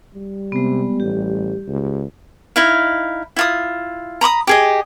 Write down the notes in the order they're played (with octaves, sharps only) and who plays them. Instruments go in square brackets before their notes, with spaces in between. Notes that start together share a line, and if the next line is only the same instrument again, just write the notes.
[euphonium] G3
[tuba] C3 [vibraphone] G#3 B3
[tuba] A1 [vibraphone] G4
[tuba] C#2
[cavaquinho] D#4 E4 F5
E4 F4 D#6
A#5 B5 C#6 D#6
G4 G#4 D#5